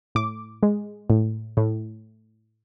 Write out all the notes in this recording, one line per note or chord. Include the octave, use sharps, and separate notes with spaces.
A2 D6
G#3
A2
A2